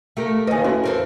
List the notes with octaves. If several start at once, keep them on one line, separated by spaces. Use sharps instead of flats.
A3 G4 A#4
D#2 B4 D#5 G#5
F2 C#4 E4 F#4 C6
F2 C4 A#4